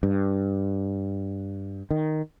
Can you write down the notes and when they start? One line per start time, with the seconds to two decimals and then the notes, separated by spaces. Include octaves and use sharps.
0.03 G2
1.91 D#3